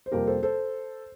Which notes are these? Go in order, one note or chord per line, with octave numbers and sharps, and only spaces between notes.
C5
F2 C3 G3 A#3 G4 A#4
A4 C5
A4 C5